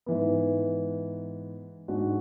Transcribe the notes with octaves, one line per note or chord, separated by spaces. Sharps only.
G#2 E3 B3
G#2 G#3 D4 F#4